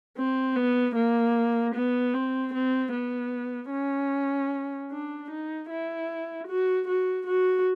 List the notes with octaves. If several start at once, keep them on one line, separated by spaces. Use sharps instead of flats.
C4
B3
A#3
B3
C4
C4
B3
C#4
D4
D#4
E4
F#4
F#4
F#4